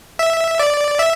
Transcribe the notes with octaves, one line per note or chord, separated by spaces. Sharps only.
E5
D5
E5